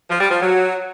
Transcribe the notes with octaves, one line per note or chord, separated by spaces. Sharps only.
F3
G3
F3
F#3